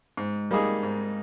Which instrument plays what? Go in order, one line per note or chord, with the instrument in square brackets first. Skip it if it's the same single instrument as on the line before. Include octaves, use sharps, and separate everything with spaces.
[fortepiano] G#2
G3 A#3 D#4 G#4
G#2